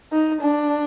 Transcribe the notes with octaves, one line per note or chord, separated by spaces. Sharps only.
D#4
D4